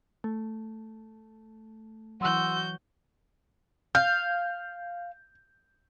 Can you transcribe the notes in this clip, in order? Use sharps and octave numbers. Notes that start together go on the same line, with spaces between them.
A3
E3 F#3 F#4 F#5 C6 E6 G6
F5 G6